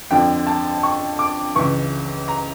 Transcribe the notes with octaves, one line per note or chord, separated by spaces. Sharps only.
F2 D3 F3 G5
A5
C#6
D6
C#2 C#3 E3 C#6
A#5